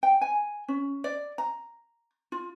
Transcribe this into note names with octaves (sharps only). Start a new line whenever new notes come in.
G5
G#5
C#4
D5
A#5
F4